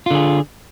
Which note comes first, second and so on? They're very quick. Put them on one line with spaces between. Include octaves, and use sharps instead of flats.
F4 D3 G#4